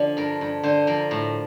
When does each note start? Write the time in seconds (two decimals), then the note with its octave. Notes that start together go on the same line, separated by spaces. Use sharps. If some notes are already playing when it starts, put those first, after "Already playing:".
Already playing: D3 F3
0.17 G2 A#4
0.41 G2
0.63 D3 C5
0.87 F3 A#4
1.11 A2